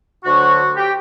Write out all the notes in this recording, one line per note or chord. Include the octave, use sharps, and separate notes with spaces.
D2 D3 F#3 F#4
G4